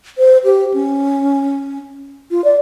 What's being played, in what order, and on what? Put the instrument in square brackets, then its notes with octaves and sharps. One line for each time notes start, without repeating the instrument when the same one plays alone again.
[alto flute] C5
G4
C#4
F4
D5